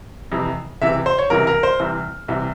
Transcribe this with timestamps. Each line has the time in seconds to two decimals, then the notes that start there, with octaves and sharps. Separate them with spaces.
0.32 F2 C3 E3
0.82 C#2 C3 E3 E5
1.06 C5
1.19 C#5
1.30 C#2 C3 E3 A#4
1.47 A#4
1.63 C5
1.80 C2 C3 E3
2.28 C2 C3 E3